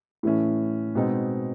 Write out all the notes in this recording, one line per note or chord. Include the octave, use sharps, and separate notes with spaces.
A2 E3 A3 C#4
B2 G#3 C4 D#4